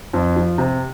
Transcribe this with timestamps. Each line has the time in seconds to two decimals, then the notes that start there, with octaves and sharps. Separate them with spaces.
0.13 F2
0.36 F3
0.58 C3